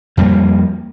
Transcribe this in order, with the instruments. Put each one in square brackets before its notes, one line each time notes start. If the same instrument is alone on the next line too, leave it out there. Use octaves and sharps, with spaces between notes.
[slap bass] F2 G3 A3 A#3